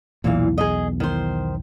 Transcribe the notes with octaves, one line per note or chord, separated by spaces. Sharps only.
B1 E2 A#2 E3 F5
G#4 D#5
D#3 C5